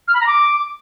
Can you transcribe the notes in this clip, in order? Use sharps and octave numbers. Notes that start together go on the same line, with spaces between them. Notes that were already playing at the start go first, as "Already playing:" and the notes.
F6
B5
A#5
D6